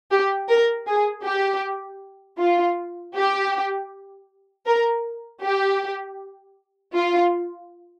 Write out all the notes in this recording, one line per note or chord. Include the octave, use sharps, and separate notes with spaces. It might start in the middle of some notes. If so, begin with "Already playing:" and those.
G4
A#4
G#4
G4
F4
G4
A#4
G4
F4